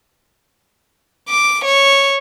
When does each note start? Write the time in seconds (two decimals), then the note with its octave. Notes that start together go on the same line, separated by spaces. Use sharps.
1.29 D6
1.65 C#5